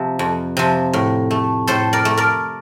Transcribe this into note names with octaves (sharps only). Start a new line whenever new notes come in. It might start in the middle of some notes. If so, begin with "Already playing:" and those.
Already playing: C3 F3
F2
C3 F3
A2
A3
A2 A4 C5
A#4 D5
A3
A#4 D5